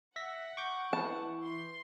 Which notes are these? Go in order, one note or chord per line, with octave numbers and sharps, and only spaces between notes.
E5 F#5 A#6 B6
C#6 D6 G6
E3 A5
C6